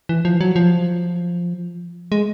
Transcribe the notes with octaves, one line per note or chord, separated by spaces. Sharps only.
E3
F3
F#3
F3
G#3